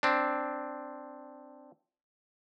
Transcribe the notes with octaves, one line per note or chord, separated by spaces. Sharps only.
C4 D4